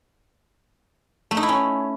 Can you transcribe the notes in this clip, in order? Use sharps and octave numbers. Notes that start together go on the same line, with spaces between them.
A3
D#4
E4
C#4